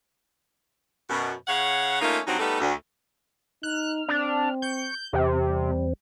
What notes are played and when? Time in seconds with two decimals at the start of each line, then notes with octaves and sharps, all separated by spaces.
1.09 F#2 B2
1.47 C#3 C#5 F5 F#5
2.01 A3 A#3 C#4 D#4 F4
2.27 G2 F#3 C4 D#4
2.39 G3 A3 B3 D#4 A4
2.60 D2
3.63 D#4 F6 F#6
4.08 C4 D4
4.62 C#6 G6
5.13 E2 C3 C4 G4
5.45 G3